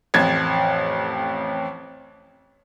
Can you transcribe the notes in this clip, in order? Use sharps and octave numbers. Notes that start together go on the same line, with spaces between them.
A1 F2 G#6